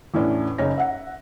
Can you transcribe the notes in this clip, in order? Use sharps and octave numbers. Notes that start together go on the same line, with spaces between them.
E2 A2 E3 C#4 D4
F#1 C#3 C#4 D#4 C#5 A#6
E5 F#5